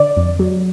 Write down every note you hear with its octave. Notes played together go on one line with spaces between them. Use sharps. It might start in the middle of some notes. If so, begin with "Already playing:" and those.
Already playing: D3 D5
F2
F#3